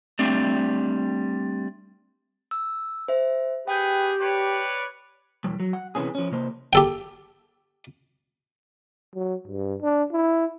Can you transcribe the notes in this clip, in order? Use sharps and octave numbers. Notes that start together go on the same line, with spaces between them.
G3 A3 C4 D4
E6
C5 E5
G4 G#4 B4 G5 G6
B4 C#5 D5
B1 E2 G3
F#3
F#5
C3 E3 B3 C#4 G#4
F3 C#4
C3 A#3 C5
G4 A4 G5
F#3
G2
D4
E4